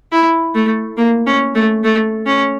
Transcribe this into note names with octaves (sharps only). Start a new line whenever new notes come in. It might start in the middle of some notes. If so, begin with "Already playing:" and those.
E4
A3
A#3
C#4
A3
A3
C#4